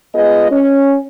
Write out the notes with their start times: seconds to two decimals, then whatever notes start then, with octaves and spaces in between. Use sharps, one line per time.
0.14 G#3 B3 F4 G#4 D#5
0.51 C#4